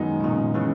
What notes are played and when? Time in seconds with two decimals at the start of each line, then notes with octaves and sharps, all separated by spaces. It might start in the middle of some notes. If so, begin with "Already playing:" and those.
Already playing: F#2 D#3 G#3 B3 D#4
0.20 B2
0.24 A#2 C#3
0.54 C#3 E3